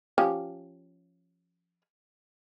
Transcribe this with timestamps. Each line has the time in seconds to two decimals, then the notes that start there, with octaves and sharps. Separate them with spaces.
0.18 F3 C#4 G4